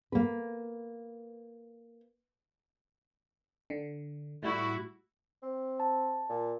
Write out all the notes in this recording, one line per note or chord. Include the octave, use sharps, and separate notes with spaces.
A#3 B4
D3
A2 G3 E4 F#4
C4
A5
A#2